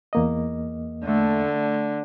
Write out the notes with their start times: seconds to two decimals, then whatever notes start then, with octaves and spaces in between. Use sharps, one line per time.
0.13 E2 A#3 D#5
1.04 D3 A3